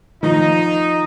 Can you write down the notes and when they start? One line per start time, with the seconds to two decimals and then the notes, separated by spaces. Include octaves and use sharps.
0.23 D#3 F3 D#4